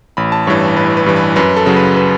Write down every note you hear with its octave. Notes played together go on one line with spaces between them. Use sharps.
A1 B5
A5
G2 E3 C#5
A1 B4
B4
G2 E3
B4
F#2 B4
A4
C#3 F#3
B4
B4